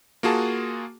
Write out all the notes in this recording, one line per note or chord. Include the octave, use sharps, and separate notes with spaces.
A#3 F4 F#4 G#4 A5